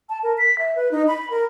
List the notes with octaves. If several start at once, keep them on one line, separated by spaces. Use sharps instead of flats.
A5
A#4
B6
E5
B4
D#4
B5
A#4